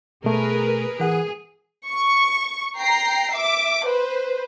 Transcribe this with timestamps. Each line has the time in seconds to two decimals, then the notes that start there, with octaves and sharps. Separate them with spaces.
0.24 B2 A3 G#4 A#4 B4
1.00 E3 G#4 F#5
1.88 C#6
2.79 G5 A#5 C7
3.33 E5 D6
3.85 B4 C5